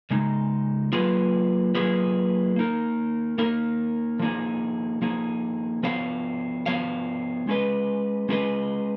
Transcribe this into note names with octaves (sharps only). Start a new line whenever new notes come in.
C#3 G#3 D#4
F#3 A#3 F4 G#4 B4
F#3 A#3 F4 G#4 B4
A#3 D#4 A#4
A#3 D#4 A#4
F3 A#3 D#4 G#4
F3 A#3 D#4 G#4
F3 B3 F#4 C#5 F5
F3 B3 F#4 C#5 F5
G#3 C#4 G#4 B4 D#5
G#3 C#4 G#4 B4 D#5